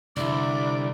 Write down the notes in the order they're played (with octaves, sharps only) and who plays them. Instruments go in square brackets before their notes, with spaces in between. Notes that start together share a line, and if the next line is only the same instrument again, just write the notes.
[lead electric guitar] C2 [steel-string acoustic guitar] D3 E4 [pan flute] D5 [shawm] D6